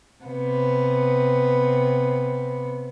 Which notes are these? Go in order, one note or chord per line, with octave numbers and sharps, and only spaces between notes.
C3 B3